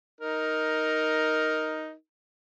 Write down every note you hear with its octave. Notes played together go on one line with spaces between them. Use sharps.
D#4 A#4